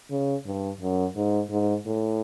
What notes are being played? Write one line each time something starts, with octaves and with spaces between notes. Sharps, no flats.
C#3
G2
F#2
G#2
G#2
A2